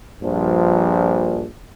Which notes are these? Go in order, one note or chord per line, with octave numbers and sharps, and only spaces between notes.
A#1 G2 A#2 F3